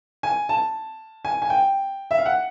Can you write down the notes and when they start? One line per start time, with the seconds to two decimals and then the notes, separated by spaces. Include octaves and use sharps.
0.23 G#5
0.49 A5
1.25 G#5
1.42 G#5
1.50 G5
2.11 E5
2.18 F5
2.25 F#5